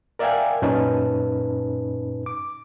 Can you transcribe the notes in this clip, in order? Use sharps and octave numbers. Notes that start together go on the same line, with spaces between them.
A#4 D5 E5 F5 G5 G#5
F#2 A#2 C#4 D#4 B4 A5
D6